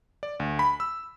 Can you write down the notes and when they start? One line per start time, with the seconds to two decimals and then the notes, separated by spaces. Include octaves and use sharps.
0.23 D5
0.40 D2
0.59 B5
0.80 E6